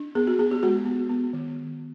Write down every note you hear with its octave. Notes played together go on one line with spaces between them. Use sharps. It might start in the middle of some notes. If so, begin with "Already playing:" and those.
Already playing: D4
B3 G#4
F#4
B3 G#4
G4
G#3 F#4
B3
B3
D#3